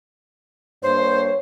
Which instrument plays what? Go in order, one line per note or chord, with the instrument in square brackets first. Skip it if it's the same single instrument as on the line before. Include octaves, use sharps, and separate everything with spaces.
[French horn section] G2 A#3 C#5 [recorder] C5